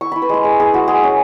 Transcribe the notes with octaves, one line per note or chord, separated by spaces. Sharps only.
E4 C#6
E4 B5
B4
G#3 G#4
G#3 G#4
E4 G#4
E4 F#4
G#3 G#4
C#4